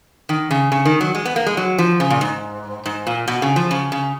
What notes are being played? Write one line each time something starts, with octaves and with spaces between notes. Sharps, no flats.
D#3
C#3
C#3
D#3
F#3
G#3
B3
A#3
G#3
F#3
F3
C#3
A#2
G#2
G#2
A#2
B2
C#3
F3
C#3
C#3